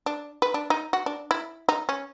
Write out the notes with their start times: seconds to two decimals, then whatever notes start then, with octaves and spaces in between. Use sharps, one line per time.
0.06 D4
0.42 B4
0.54 D4
0.70 D#4
0.93 F#4
1.06 D4
1.31 E4
1.69 D#4
1.89 C#4